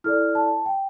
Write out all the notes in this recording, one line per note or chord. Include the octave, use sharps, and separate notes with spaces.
E4 A4 D5 F6
A5
G5